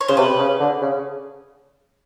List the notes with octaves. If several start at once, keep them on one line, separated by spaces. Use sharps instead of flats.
C#5
C#3 C5
C3 B4
C#3
D3
C#3